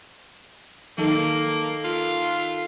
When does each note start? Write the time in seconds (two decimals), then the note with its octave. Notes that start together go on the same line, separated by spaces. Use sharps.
0.98 D#3 A#3 A4
1.84 F4